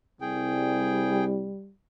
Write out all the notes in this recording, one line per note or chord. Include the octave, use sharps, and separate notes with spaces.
C2 G3 G#4 G5